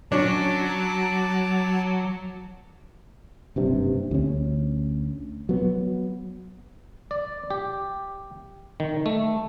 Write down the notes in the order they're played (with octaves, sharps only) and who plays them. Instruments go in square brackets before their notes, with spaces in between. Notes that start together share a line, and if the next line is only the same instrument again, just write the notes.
[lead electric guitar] F#3 [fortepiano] C#4 D4 [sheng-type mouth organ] A5 D6
[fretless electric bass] F#1 G2 C3
D2 C#4
F#3 B3
[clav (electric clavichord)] D5
G4
D#3
A3